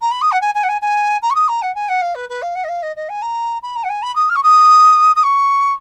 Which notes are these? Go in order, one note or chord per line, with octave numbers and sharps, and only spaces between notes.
A#5
B5
D#6
F#5
G#5
G#5
F#5
G#5
G#5
A#5
C#6
D#6
A#5
F#5
G#5
F#5
F5
B4
B4
F5
F#5
D#5
F5
D#5
D#5
G#5
A#5
B5
A#5
F#5
G#5
B5
D#6
F6
C#6
D#6
D#6
C#6